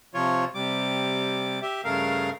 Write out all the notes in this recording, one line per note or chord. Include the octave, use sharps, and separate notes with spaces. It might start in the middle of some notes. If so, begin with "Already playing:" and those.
C3 F3 F4 C#5
C3 G3 D6
G4 E5
G2 C#3 A3 A#4 F5